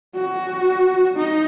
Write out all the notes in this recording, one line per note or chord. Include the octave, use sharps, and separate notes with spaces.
F#4
D#4